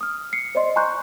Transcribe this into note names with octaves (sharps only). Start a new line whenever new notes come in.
D#6 F6
C7 C#7
C5 D5 D#5 C6
G#5 A#5 C6 C#6 F#6 G6